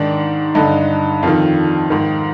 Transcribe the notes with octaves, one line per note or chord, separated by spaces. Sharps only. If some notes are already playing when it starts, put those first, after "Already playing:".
Already playing: G#2 D#3 D4
G2 D3 D#4
F2 D#3 F4
G#2 D#3